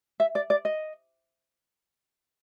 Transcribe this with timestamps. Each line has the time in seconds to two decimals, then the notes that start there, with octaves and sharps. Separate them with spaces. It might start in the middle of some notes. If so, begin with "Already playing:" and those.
0.20 E5
0.35 D5
0.50 D5
0.65 D#5